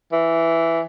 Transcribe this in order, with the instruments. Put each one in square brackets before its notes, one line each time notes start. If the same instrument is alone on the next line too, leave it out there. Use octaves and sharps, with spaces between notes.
[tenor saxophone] E3